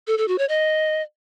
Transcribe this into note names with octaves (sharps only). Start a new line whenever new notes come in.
A4
A4
F#4
C#5
D#5